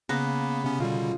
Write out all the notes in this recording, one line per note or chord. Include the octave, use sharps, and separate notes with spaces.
C#3 A#3 B3 B4 A#5
C3 B3 C#4
B2 D3 G3 F4